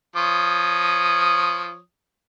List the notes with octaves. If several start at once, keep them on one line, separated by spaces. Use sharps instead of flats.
F3 C#5 D#6